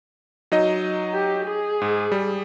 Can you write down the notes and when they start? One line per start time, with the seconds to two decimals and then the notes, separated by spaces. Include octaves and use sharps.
0.52 F#3 D#4 D#5
1.14 G4
1.45 G#4
1.82 G#2
2.12 G3